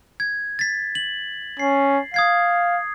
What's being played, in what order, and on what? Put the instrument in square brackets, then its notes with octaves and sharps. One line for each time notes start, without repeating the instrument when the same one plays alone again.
[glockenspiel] G#6
A6 B6
F#7
[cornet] C#4 [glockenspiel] C7
[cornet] F5 [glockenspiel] D#6 G#6 C7